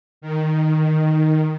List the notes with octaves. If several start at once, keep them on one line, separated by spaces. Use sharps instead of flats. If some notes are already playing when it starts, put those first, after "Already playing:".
D#3